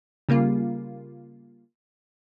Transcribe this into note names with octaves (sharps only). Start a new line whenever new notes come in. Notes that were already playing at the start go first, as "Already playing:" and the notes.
C#3 G3 A#3 F4